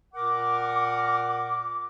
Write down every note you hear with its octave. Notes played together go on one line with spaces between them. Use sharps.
A#2 A#4 F#5 D6